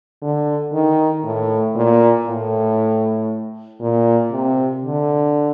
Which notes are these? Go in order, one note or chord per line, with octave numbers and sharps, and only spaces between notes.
D3
D#3
A2
A#2
A2
A#2
C3
D3